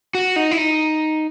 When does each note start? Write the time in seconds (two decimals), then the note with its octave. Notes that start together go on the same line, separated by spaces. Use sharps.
0.15 F#4
0.36 D#4
0.51 E4
0.58 D#4